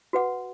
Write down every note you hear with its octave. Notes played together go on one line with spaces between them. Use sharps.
F#4 B4 F#5